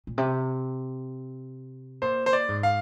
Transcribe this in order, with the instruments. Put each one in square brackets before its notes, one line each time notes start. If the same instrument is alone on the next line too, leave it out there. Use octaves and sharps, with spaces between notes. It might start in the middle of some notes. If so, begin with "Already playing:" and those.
[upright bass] A#2
C3
[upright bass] A#2 [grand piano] C5
[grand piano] C5
D5
[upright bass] G#2
[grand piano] F5